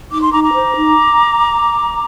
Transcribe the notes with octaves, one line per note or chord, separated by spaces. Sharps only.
D#4 D6
C6
D#4 A#5 D6
A#5 D6
C5
D#4